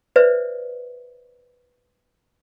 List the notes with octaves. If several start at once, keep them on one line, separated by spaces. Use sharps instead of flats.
B4 C5 D5 E5